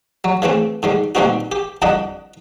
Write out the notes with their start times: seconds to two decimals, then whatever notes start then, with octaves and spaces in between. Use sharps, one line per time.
0.24 F#3
0.42 C#3 E3 A3 C4
0.83 G#2 D3 G3
1.15 A#2 D3 G3 C4 D#4 F#4
1.52 G4
1.82 C2 F2 D3 D4 D#5 F#5